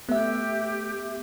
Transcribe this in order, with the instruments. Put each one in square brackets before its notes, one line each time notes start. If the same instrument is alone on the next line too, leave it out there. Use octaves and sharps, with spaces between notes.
[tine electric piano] A3 [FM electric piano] B3 E5 [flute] G4